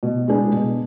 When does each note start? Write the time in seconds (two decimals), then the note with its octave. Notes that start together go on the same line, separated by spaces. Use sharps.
0.03 B2
0.28 G#3 D4 G#4 B4
0.52 B2